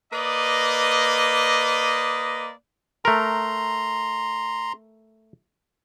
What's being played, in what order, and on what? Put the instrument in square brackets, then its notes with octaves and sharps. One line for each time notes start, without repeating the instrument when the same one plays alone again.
[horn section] A#3 B4 D5 D#5
[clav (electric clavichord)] A3 A#4 [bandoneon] A#5 C6